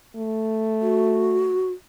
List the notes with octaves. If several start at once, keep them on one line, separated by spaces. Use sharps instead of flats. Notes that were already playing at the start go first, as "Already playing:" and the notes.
A3
F#4